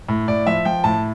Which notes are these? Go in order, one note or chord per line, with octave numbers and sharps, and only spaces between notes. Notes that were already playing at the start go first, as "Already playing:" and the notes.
A2
A2 D5
F3 E5
F3 G5
A2 A5